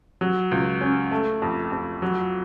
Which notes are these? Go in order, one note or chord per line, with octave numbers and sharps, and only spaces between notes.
F#3
C#2
C#4
A3
F2
F2
F#3